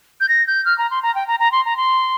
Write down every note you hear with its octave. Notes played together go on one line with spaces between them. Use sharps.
G6
A#6
G6
F6
A#5
C6
A#5
G5
A#5
A#5
C6
A#5
C6